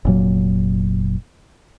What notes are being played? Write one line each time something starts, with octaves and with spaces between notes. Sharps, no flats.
F1 A#2 F#3